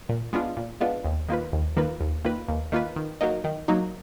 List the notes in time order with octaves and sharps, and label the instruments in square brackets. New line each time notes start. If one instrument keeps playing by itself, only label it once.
[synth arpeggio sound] A#2
G#3 B3 D4 F4
A#2
G#3 B3 D4 F4
D#2
D#3 A#3 F4 B4
D#2
D#3 A#3 F4 B4
D#2
D#3 A#3 F4 B4
D#2
D#3 A#3 F4 B4
D#3
F#3 A#3 D#4
D#3
F#3 A#3 D#4